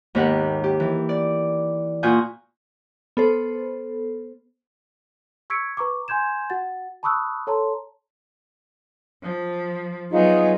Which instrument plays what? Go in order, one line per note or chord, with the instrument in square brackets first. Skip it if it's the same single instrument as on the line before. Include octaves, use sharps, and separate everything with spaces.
[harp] D#2 G#2 B3 G4 A#4 F#5
G4
E3
D5
A#2 F4 F#4 G#5 D#6 G6
[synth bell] B3 A4 C5
[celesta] C#6 E6 G#6 B6 C#7 D7
B4 A#5 C#6 D6
G#5 C6 G6 G#6 E7
F#4 F#5 A6
A5 B5 C#6 D#6 E6 F#6
A4 C#5 A5 A#5 C6
[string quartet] F3
[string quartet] F#3 B3 [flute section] D#4 F4 G#4